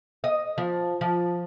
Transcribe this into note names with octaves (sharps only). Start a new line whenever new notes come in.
D#5
F3
F3